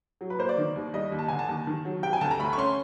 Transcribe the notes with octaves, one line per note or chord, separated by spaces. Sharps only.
F#3
B4
A#3 C5
D5
D#3
D#2
G3 D#5
D#2
A5
D3 G#5
A5
D#2
D#3
F#3
C3 G5
G#5
D2 A5
A#5
A3 B5
C#6
C#4 C6